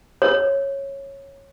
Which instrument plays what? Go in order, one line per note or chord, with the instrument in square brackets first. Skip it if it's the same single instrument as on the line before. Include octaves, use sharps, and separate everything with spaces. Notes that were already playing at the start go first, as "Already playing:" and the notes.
[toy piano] C#5